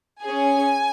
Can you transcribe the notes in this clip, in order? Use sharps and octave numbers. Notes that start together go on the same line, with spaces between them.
C#4 G#4 G#5